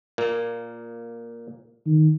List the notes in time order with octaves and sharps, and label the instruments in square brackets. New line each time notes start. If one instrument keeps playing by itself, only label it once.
[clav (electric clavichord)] A#2 A#3
[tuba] D#3